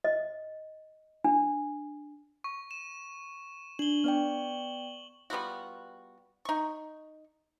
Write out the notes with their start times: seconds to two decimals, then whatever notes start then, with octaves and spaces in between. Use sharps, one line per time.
0.04 D#5
1.24 D4
2.44 C#6
2.71 E7
3.79 D4 F#7 G7
4.04 B3 D5 G5
5.30 G3 B3 F4 F#4
6.45 D#4 C#6